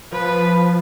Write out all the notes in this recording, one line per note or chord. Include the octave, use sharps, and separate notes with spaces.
F3 B4